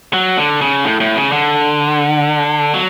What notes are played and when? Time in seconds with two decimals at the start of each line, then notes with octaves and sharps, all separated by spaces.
0.13 F#3
0.38 D3
0.61 C#3
0.84 A2
1.00 A2
1.16 C#3
1.32 D3
2.74 F#3